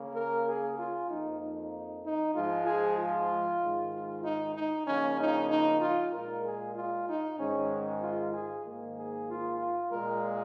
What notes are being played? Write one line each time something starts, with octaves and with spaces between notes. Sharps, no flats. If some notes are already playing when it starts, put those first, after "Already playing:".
Already playing: C#3 A#3
A#4
G#4
F4
F2 F3 A#3 D#4
D#4
D#4
G#2 F3 G#3 F4
G#4
F4
G#2 D#3 G#3
F4
D#4
D#4
C#3 F3 A#3 C#4
D#4
D#4
F4
A#2 G#3 A#4
G#4
F4
D#4
G#2 D#3 G#3 C#4
F4
G#4
G#2 D#3 A#3
G#4
F4
F4
A#2 G#3 A#4